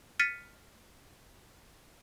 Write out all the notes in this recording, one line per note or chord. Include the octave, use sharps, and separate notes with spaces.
F6 A6 B6 C#7 D#7